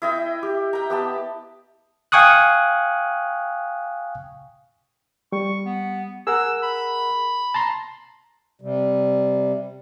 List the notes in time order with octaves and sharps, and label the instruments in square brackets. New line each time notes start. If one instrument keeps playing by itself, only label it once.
[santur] E4 D#5 G5
G4
G5 A#5
B3 G4 A5
[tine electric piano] F5 G5 G#5 C#6 D#6 F#6
[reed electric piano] G3 [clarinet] C#6
[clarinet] B3
[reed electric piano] G#4 A#4 F#5 [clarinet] E6
[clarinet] B5
[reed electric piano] A5 A#5 C6
[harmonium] C3 G3